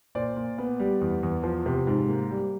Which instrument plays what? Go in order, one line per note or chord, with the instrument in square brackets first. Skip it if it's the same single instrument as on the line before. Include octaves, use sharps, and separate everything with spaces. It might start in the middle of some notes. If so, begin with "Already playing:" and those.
[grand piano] A#2 C5 D5
A#2
B3
G3
E2
E2
F3
C3
G#2
A#3
G3